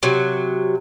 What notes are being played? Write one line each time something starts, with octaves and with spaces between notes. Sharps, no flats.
C3 F#3